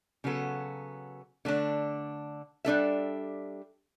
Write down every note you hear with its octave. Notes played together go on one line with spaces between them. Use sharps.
C#3 F#3 B3 F#4 A4
D3 A3 D4
G3 D4 A4 E5